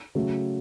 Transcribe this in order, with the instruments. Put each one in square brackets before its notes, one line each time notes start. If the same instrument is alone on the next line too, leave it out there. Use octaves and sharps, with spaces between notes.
[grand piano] C#3 F#3 A3